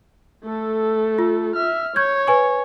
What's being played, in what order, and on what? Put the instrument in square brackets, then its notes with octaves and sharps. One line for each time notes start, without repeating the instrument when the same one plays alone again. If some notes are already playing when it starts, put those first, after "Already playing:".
[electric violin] A3 A4
[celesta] F4
[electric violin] E5 F6
[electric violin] C#5 [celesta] C#6 G6 G#6
[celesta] B4 G#5 C#6